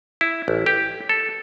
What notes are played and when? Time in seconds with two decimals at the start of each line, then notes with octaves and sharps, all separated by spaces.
0.21 E4
0.48 A1
0.66 G4
1.09 A4